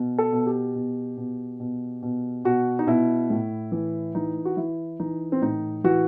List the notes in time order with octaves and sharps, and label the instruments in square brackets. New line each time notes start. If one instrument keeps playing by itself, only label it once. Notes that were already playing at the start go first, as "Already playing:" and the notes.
Already playing: [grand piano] B2
A4
B2
G4
B2
B2
B2
B2
B2 F#4
D#4
B2 E4
A2
E3
E3 D#4
F#4
E3 E4
E3 D#4
C4
A2 D#4
E3 F#4